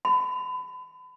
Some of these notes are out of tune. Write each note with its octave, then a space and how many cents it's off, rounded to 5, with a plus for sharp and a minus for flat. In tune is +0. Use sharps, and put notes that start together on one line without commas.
B5 +35